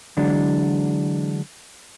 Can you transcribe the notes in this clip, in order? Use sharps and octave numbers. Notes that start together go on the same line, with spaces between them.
D3 E3 F#3 G#3 D4